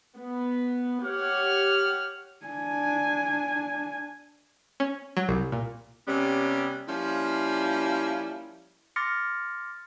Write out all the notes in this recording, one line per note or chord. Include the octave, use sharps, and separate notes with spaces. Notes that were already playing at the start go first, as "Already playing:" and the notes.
B3
G4 C#5 F#5 F6
D4 G#5
C#4
F#3
C2
A#2
C3 G3 B3 C#4
F3 G3 A#3 C#4 E4
C6 D6 F6 A6 A#6 C#7